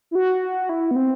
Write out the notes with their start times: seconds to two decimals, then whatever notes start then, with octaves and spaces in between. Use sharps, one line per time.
0.11 E4
0.15 F#4
0.69 E4
0.91 B3
0.96 C4